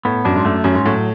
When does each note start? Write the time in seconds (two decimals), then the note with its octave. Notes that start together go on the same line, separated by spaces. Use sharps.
0.05 A2 B3
0.25 F#2 D4
0.36 G#2
0.45 F#2 A3
0.64 F#2 C#4
0.75 G#2
0.85 A2 F#3